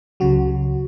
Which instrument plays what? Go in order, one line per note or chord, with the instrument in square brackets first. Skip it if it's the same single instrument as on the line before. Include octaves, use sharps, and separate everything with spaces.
[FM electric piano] C#2 C#3 F#3 F#4